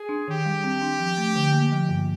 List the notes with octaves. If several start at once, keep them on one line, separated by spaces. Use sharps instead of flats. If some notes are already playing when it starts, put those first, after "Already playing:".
Already playing: G#4
D4
D#3 G4
G3
C4
D4
F3
A3
D3
A#3
F3
G2